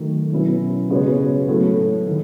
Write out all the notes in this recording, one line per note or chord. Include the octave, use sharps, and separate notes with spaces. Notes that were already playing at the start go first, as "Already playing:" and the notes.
Already playing: D#3 F#3 A3
B2 F#3 C#4 E4 B4
C#3 G#3 B3 F#4 C#5
A2 F#3 A3
D#3 G#3 B3